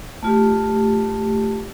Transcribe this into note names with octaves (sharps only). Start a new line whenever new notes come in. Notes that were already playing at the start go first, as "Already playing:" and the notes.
A3 F4 G4